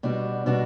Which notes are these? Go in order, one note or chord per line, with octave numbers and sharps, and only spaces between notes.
B2 G3 D4 F#4
B2 G3 D4 F#4